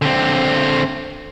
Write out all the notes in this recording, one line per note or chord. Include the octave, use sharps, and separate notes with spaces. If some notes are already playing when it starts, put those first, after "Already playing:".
D3 C4